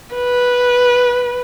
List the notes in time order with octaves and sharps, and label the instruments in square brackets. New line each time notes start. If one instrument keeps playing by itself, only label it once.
[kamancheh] B4